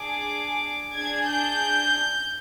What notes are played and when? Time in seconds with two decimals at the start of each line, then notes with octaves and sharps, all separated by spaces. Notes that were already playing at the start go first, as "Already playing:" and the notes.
Already playing: D4 G#4 D6
0.95 D4 G#4 G#6
1.25 G6